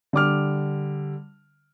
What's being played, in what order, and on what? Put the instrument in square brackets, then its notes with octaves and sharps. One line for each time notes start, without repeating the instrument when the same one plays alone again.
[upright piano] D3 G3 D6 F6